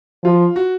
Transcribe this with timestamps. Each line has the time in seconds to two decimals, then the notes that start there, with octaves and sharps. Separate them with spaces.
0.24 F3 F4
0.56 F#4